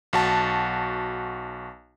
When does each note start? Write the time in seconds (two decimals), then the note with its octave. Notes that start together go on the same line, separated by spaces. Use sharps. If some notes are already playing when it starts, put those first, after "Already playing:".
0.13 B1 F#4 A5